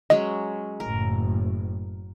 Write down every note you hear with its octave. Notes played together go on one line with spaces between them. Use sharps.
F#3 G#3 C#4 D#5
F#1 A2 A#4